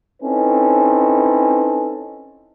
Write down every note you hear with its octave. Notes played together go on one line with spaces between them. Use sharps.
C4 C#4 D#4 E4 A4 B4